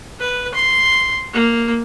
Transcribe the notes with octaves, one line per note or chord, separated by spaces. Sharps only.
B4
C6
A#3